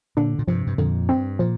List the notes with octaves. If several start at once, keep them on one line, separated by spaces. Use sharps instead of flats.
A#2 D3 D4
A#2
G2 C3 F3
G2
F2 A#2 D3
G2 C4
A#2 F3